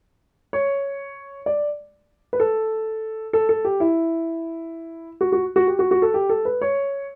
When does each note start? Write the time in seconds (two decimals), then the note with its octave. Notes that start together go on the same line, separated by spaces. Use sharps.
0.53 C#5
1.46 D5
2.33 B4
2.40 A4
3.33 A4
3.49 A4
3.65 G4
3.80 E4
5.21 F#4
5.32 F#4
5.56 F#4
5.67 G4
5.79 F#4
5.91 F#4
6.02 A4
6.14 G4
6.29 A4
6.45 B4
6.62 C#5